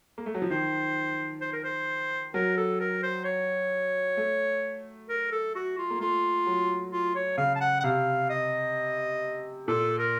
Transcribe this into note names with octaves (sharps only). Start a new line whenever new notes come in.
A#3
A3
F#3
F3
D#3 C5
C5
A#4
C5
F#3 A#4
A4
A#4
C5
C#5
A3
A#4
A4
F#4
F4
A#3
A3 F4
F#3
F4
C#5
C#3 F5
A5
F#5
F#5
C3 F5
D#5
A#2 A4
A#4